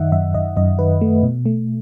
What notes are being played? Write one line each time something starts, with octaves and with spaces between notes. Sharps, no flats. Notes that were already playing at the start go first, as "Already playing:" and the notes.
Already playing: F#2 D#3 D#5 E5 F#5
F#2 E5
F#2 D#5
F#2 D#5
D#3 B4
A3
B2
A3